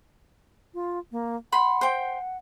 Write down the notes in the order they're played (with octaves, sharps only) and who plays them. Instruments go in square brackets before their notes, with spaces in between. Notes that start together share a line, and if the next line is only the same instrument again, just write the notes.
[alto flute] F4
A#3
[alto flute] F#5 [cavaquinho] B5 C6
[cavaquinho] C5 G5